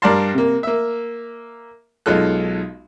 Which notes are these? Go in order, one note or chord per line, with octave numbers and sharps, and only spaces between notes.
G2 A#4 D5 F5 A5 C6
C3 A#3
A#3 E5
B1 G#3 D#4 F4 A4 F#6